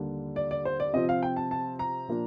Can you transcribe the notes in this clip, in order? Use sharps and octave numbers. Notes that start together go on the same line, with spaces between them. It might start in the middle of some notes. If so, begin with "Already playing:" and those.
Already playing: D#2 D3 G3 A#3 D4
D5
D5
C5
D5
C3 F3 C4 F4 D#5
F5
G5
A5
A5
A#5
A#2 F3 A#3 D4 F4